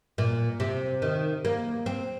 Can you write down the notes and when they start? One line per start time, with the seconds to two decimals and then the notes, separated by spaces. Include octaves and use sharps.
0.18 A#2
0.60 C3
1.02 D#3
1.45 A#3
1.86 C4